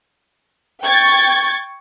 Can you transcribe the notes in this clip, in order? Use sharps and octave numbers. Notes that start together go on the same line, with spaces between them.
G5 C#6 G#6 A6